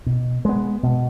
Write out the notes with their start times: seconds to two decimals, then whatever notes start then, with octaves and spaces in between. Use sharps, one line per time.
0.06 B2
0.45 G#3 B3
0.83 B2